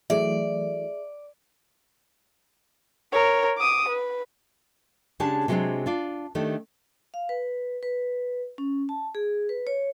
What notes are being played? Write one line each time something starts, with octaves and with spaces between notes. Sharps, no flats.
E3 F#3 A3 G#4 D5 E5
A#4 C#5
D6 D#6
B4
C#3 G#3 D4 G4 C#5 A5
C3 F#3 G#3 A#3 C4 D4
D4 F4 D5
D#3 A3 D4 G4
F5
B4
B4
C#4
A5
G#4
B4
C#5